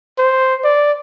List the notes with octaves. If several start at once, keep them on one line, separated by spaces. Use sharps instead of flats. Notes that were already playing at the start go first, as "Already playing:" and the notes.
C5
D5